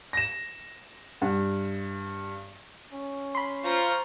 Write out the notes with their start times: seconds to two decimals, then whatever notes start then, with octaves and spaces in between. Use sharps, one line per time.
0.13 A#6 E7
1.22 G2
2.93 C#4
3.35 B5 C6
3.64 F4 C5 A#5 C#6